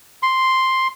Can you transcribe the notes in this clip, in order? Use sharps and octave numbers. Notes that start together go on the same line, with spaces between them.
C6